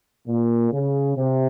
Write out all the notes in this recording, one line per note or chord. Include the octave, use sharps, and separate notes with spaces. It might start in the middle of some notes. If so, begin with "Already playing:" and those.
A#2
C#3
C3